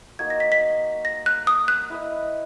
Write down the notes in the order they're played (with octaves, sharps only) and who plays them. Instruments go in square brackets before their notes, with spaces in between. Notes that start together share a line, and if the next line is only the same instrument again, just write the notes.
[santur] A#3 D#4 F#4 A#4 [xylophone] G#6
[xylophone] A#6
B6
B6
A#6
F#6
D#6
F#6
[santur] E4 B4 D#5